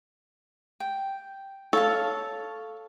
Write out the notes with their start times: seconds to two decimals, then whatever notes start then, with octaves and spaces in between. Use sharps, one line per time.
0.80 G5
1.73 A4 C#5 F5 A5